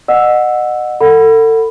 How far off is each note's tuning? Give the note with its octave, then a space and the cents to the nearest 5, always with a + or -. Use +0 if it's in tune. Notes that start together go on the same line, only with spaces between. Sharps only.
D#5 -30 F#5 -15 E6 +0
A4 +35 F#5 +0 B5 +0